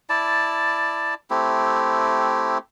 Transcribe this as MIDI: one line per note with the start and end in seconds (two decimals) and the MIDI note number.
0.10 1.14 64
0.10 1.14 74
0.10 1.14 81
1.30 2.58 57
1.30 2.58 60
1.30 2.58 64
1.30 2.58 67